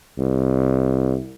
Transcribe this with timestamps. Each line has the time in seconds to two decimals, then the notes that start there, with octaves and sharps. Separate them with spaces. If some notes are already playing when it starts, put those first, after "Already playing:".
0.18 C2